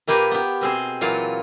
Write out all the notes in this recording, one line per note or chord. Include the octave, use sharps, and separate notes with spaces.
A#2 A#3 G4 B4 F5
B3 G4
B2 C4 G#4 C5
A#2 E3 F#3 F4 F5